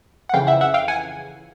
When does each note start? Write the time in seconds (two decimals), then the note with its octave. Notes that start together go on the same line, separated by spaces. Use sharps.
0.29 F#5
0.33 F2 C#3 E3 F5 G5
0.47 E5 F#5
0.61 E5 F#5
0.74 F5 G5
0.88 F#5 G#5